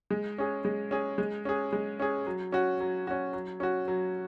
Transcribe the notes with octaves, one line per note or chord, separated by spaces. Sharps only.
G#3
C#4 G#4
G#3
C#4 G#4
G#3
C#4 G#4
G#3
C#4 G#4
F#3
C#4 F#4
F#3
C#4 F#4
F#3
C#4 F#4
F#3